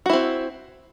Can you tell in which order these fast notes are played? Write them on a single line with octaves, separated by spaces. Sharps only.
F#4 E4 C4